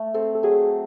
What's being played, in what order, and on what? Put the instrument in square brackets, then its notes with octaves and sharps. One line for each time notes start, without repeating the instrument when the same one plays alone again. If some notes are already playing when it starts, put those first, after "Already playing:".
Already playing: [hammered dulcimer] A3
[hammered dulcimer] C4 [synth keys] A4
[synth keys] A4
[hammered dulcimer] F#3 [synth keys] G#4